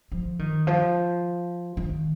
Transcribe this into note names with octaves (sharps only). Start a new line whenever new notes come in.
F3
D#3
F3
D#3